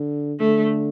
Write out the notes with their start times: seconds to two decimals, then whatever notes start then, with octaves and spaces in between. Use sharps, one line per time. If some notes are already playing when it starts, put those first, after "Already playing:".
Already playing: D3
0.39 D3 A3